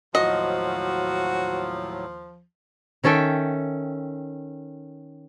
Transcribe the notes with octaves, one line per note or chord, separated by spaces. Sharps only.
D#2 A2 F3 F#3 F#4 D#5
D#3 C#4 A4 E5 G5